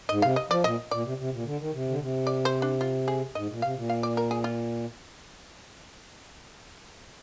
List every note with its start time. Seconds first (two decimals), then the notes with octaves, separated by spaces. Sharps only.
0.09 G#2 D#5
0.22 C3 F5
0.36 D#5
0.50 F3 D5
0.64 A#2 D#5
0.91 A#2 D5
1.04 C3
1.18 C3
1.32 A#2
1.45 D3
1.59 D#3
1.72 C3
1.89 D3
2.00 C3
2.27 D5
2.45 C5
2.62 D4
2.81 F4
3.08 G#4
3.35 G#2 D#5
3.49 A#2
3.62 C3 F5
3.76 A#2
3.90 F5
4.03 D5
4.17 A#4
4.31 G#4
4.44 F4